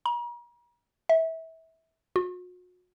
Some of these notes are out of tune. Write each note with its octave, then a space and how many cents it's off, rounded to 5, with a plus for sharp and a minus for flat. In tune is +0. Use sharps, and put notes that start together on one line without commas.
A#5 +40
E5 -25
F#4 -40